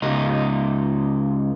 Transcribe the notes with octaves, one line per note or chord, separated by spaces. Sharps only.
C#2 D#4